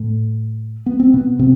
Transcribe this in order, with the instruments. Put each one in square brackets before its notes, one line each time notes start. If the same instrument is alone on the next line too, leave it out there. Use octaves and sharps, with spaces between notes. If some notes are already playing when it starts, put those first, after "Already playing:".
Already playing: [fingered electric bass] A2 A3
B3
C4
B2 B3
C3 C4